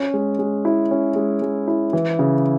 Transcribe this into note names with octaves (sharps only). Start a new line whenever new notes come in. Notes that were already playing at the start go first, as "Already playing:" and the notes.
Already playing: C#4
G#3
G#3
E4
C#4
G#3
G#3
E4
E3
C#3